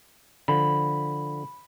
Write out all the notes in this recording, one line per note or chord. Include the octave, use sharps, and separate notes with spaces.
D3 F3 B5